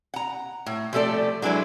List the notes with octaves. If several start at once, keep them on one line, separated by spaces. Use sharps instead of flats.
F#5 A#5
A2
F3 G3 A3 F4 A4 D5
F#3 G#3 D4 E4 B4